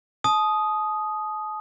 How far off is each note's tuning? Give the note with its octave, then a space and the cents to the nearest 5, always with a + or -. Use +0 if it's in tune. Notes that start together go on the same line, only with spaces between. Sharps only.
A5 -40 D#6 +0